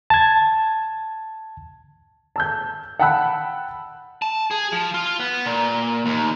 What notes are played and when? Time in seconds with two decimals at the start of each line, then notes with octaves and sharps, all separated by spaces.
0.10 A5 G#6
2.36 A5 E6 G6
2.99 F#5 G5 A5 B5 E6 F#6
4.22 A5
4.51 G#4
4.72 F3
4.94 F4
5.20 B3
5.46 A#2
6.06 D#2